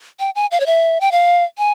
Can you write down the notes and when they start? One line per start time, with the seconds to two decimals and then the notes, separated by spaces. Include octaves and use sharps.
0.20 G5
0.35 G#5
0.51 F5
0.60 C#5
0.66 E5
1.01 G5
1.12 F5
1.58 G#5